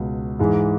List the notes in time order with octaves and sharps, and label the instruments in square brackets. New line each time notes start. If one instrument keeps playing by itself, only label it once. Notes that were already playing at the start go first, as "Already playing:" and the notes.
Already playing: [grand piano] C#2 B2
G#2 E3 G#3